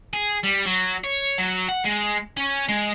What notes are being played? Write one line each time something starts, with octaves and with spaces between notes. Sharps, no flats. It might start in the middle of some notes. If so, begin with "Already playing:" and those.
G#4
G3
F#3
C#5
F#3
F#5
G#3
C#4
G#3